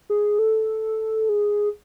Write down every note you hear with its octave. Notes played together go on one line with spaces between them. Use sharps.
G#4
A4
G#4